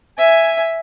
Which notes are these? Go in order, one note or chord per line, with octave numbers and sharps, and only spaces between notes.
E5 G#5